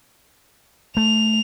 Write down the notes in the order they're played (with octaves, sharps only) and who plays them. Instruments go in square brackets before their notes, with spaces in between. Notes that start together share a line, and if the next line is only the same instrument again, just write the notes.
[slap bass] A3 [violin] F7